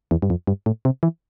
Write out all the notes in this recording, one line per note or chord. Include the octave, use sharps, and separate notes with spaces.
E2
G2
F2
G2
A2
C3
E3